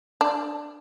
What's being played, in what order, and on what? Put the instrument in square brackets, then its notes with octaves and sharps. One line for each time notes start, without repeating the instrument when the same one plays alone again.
[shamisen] D4